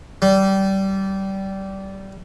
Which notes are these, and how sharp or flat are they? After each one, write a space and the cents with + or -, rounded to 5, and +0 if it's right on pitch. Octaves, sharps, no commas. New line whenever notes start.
G3 -20